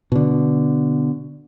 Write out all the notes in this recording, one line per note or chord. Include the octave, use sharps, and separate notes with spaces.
B2 D3